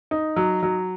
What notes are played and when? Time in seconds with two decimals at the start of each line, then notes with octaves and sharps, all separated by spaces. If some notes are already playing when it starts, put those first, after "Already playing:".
0.11 D#4
0.36 F#3
0.63 F#3